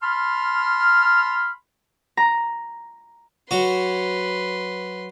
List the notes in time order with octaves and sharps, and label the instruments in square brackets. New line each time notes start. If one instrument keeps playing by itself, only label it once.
[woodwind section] A5 B5 C6 F6
[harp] A#5
[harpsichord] F#3 F#4 [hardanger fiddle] B4 C6